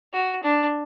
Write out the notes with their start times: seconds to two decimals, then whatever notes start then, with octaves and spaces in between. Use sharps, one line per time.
0.13 F#4
0.43 D4